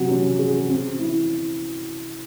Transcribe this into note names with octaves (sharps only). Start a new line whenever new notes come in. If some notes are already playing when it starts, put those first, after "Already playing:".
Already playing: C3 F#3
C#4
G#4
C4
E4